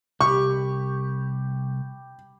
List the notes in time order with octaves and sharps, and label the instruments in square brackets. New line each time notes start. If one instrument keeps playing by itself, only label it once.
[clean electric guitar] C2 [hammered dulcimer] G4 B5 [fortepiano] C#6